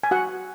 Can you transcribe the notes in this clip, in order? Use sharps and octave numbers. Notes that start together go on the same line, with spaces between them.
G#5
F#4 F#5